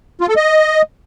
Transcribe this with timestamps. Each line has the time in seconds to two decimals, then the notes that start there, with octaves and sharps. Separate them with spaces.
0.21 F4
0.29 A4
0.36 D#5